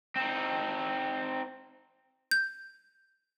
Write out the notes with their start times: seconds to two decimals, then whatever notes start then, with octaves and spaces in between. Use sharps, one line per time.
0.16 C4 D#4
2.31 G6